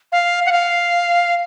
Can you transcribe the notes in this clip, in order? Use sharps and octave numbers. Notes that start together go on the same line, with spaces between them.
F5
F#5
F5